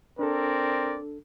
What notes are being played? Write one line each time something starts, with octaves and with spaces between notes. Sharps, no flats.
C4 D4 A4 A#4 D5